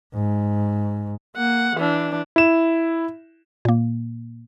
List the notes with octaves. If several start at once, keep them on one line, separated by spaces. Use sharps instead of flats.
G#2
A#3 F#5
E3 D4
E4 E7
A#2 A#3